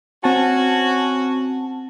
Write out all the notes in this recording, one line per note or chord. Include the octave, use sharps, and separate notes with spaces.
C4 C#4 F#4 A5